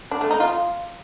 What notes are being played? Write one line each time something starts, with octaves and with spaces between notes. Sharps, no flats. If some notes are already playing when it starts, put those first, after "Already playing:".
D4
A3
D#4
F4